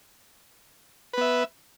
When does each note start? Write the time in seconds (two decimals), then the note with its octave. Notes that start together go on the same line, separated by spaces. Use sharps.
1.13 B4
1.17 B3
1.21 E5